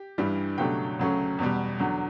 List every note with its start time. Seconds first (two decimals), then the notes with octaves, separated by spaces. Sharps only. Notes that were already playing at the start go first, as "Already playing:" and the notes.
Already playing: G4
0.18 G2 E3 G3
0.58 C#2 B2 F#3 A3 D4 G4 G5
0.99 D2 C#3 F#3 A3 C#4
1.39 E2 B2 G3
1.79 E2 D3 F#3